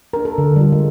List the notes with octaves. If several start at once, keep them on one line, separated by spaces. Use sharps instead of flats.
D4 A#4
A4
D3
G3 F4
G#3